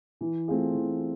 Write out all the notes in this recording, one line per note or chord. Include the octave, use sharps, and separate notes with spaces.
E3
A3 C4 F4 G#4
E3